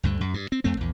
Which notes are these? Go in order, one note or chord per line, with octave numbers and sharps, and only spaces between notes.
D2 G2 D3
F#2
G2
C4
F2 A3 C4
A#1 E2